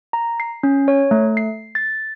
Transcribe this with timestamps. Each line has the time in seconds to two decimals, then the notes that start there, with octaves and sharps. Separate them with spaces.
0.13 A#5
0.40 C7
0.63 C#4
0.88 C#5
1.11 A3
1.37 C7
1.75 A6